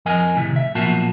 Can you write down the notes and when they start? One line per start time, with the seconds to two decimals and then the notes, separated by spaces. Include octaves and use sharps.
0.06 F2 F3 A#4 D#5 G#5
0.36 A2 C3 D#3
0.56 E5
0.75 B1 A#2 F3 A#3 F#4 A5